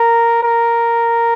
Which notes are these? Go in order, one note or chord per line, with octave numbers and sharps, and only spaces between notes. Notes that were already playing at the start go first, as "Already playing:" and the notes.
Already playing: A#4
A#4